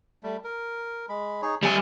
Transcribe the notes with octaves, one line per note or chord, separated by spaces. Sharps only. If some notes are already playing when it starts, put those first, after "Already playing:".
G3 A3
A#4
G#3 B5
D#4 G#4 C#5
G3 D5 E5 G#5